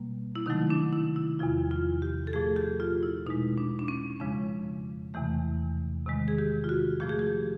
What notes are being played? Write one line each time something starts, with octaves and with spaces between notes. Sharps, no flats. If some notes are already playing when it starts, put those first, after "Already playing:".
Already playing: B2 G3 A#3
E4
C3 D#3 F#3 A3 D#4
D4
E4
E4
E2 C3 F3 F4
F4
G4
A4
A#2 F3 A3 G#4
G4
F4
E4
B2 G#3 D#4
D4
D4
C#4
F2 C#3 F3 G#3 D4
E2 C3 E3 A3
C3 D#3 G#3
G#4
G4
F4
F#4
A#2 F3 A3 G4
G#4
G4